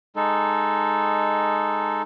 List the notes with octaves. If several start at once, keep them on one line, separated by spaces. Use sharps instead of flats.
G#3 D#4 A4